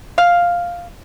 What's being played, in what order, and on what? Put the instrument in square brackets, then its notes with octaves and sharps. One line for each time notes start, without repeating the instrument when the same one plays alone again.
[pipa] F5